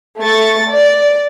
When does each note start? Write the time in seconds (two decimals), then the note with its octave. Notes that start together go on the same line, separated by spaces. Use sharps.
0.19 A3 C#6 A6
0.68 D5